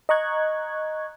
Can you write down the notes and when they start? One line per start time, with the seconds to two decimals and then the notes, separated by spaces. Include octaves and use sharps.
0.09 D#5 A#5 C#6 F#6 G#6